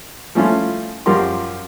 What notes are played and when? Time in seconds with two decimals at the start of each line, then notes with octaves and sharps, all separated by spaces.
0.35 F3 A3 C#4 E4 F4
1.06 F#2 F3 F4 G4 A#4 C6